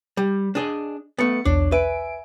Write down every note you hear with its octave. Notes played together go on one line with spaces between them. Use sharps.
G3
D4 G#4 D#5
A3 B3 A6 C#7
B1 E2 D4 C#5
B4 E5 G#5 D7